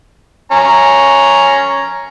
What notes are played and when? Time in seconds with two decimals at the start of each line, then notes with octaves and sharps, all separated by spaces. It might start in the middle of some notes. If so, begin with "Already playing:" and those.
0.52 C#4 A#5